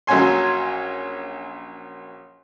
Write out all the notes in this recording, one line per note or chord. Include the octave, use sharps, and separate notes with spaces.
A#1 F#3 C#4 G#5 C6